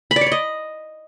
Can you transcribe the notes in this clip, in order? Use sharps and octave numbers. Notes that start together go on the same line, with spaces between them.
B5
D5
C#5
D5
D#5